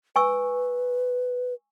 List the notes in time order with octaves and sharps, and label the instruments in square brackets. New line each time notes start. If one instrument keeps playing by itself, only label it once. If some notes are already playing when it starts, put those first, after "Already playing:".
[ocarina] B4 [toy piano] G#5 C#6 E6